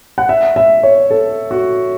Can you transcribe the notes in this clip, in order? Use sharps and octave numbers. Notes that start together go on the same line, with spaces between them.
F#5
E5
E5
C#5
A4
F#4